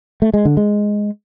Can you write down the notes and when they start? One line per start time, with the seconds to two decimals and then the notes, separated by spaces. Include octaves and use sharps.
0.22 A3
0.34 G#3
0.45 D3
0.57 G#3